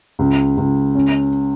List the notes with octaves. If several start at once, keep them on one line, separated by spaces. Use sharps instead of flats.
C#2
C#2
C#4